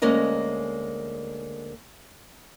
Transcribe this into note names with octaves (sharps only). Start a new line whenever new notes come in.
D2 G#3 A#3 C#4 A#4 D#5